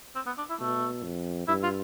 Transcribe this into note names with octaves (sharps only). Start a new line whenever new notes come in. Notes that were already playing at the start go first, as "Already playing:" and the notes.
C4
B3
D4
E4
B2 A3
F2
G2 E4
F4